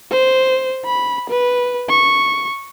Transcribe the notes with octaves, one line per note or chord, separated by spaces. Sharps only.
C5
B5
B4
C#6